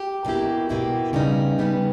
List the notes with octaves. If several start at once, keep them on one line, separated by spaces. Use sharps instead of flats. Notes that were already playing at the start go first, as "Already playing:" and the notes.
Already playing: G4
B2 A#3 E4 G4
B2 A#3 E4 G4
C#3 G3 B3 D#4
C#3 G3 B3 D#4